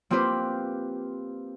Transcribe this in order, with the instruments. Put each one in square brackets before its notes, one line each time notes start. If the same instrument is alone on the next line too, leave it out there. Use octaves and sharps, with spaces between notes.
[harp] A#3 C4 F4 G4 B4 C5